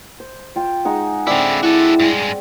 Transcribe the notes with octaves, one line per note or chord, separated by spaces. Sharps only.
C5
F4 G5
G#3 D#4 F#5
D3 C4 E4 D5
E4 F#4 A4
G2 G#3